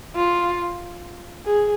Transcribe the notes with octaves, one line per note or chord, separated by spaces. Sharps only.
F4
G#4